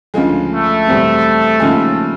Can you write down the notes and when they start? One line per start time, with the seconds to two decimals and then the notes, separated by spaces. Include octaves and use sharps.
0.14 D2 C#3 F3 G#3
0.51 A3
0.87 E2 B2 G3 C4
1.60 D#2 C#3 F3 G#3